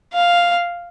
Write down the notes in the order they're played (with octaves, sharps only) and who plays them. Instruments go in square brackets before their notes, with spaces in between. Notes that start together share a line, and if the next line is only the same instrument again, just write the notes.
[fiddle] F5